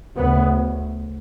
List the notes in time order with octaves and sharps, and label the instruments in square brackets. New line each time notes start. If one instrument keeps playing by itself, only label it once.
[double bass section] D2 C#3 B3